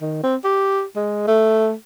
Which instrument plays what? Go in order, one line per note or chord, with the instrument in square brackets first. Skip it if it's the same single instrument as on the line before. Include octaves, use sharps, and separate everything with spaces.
[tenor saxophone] D#3
C4
G4
G#3
A3